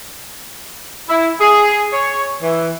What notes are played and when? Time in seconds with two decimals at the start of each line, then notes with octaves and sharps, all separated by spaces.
1.09 E4
1.40 G#4
1.92 C#5
2.41 E3